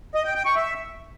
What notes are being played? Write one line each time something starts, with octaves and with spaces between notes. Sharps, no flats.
D#5
G5
G5
C#6
E5